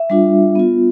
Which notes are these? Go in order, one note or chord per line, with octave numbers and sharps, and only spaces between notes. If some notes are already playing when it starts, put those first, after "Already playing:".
Already playing: E5
G3 D4 F4
B3 F4